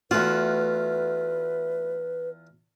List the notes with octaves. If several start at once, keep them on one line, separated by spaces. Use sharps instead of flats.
E2 A3 F4 F#4 B4